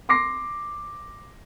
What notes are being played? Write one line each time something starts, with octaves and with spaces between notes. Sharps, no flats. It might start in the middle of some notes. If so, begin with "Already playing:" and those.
C6 D6 A#6 C7